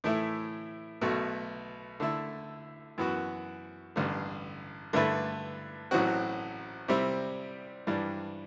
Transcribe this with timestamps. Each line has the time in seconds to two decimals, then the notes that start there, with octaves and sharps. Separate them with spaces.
0.04 A2 E3 A3 E4
1.01 B1 B2 A3
2.00 D3 A3 E4
2.98 F#2 E3 B3 F#4
3.96 A1 G2 D3
4.93 G2 D3 A3 E4 B4
5.91 A1 A2 F#3 C4 F#4
6.88 C3 G3 C4 E4
7.87 G2 E3 G3 D4